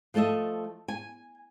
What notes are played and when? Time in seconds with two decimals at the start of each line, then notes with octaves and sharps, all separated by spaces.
0.14 F3 A3 A4 D#5 E5
0.88 G#5